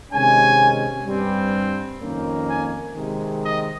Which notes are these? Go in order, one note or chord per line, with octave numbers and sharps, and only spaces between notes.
C3 D#3 G#3 C#4 G#5
G2 G3 C4
F2 D#3 A#3 C#4
G#5
C3 D#3 G#3
D#5